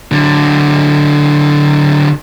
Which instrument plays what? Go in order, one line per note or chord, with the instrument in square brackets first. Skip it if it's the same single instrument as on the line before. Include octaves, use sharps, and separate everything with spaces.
[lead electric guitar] D3 F#3